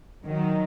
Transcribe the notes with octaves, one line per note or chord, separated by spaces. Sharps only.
D#3 F#3